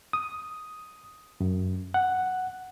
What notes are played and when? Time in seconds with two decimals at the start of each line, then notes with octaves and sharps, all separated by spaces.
0.13 D#6
1.40 F#2
1.94 F#5